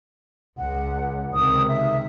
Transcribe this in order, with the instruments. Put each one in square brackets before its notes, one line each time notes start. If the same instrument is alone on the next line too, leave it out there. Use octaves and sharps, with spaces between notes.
[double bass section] C#2 [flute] F#5
[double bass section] C#2 C3 D#3 [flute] D#6
[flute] E5